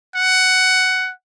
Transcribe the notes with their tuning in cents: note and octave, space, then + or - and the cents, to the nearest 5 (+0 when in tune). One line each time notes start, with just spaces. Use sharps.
F#5 +10